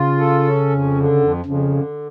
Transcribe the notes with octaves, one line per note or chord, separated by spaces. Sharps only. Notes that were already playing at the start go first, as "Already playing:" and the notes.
Already playing: C#3 F4
A4
C#4
F2
D3
F2
F2 C#3
D3